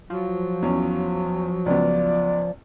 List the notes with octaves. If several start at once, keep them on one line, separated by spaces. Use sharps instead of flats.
F3 F#3
E2 C#4
C#2 B3 D5